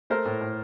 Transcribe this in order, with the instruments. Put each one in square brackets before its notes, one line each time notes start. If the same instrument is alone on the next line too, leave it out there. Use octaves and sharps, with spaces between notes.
[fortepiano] A3 A#4 C5
A2
A2